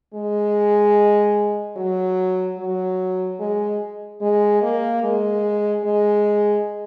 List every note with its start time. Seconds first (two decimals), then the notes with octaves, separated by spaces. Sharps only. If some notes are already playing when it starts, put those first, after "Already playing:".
0.14 G#3
1.76 F#3
2.58 F#3
3.39 G#3
4.21 G#3
4.62 A#3
5.03 G#3
5.84 G#3